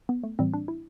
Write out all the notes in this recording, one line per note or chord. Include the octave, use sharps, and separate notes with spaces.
B3
A3
A2 E3 G3 C4
D4
E4